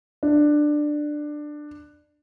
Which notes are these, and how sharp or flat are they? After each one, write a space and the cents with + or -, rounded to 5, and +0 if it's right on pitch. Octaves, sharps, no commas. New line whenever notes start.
D4 +15